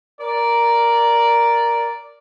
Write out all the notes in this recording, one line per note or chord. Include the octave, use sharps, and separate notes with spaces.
A#4 D5